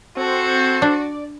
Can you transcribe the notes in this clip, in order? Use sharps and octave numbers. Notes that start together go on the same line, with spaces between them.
C4 F#4 A4 C5
D4 D5